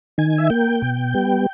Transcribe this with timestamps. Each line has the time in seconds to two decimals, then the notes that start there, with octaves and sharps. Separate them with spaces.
0.18 D#3 G#5
0.38 E5
0.50 A#3 G5
0.82 B2
1.14 G3 B3